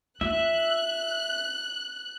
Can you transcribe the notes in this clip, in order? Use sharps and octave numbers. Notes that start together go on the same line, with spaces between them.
F4 E5 F#6